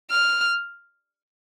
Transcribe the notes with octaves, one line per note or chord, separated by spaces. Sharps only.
F6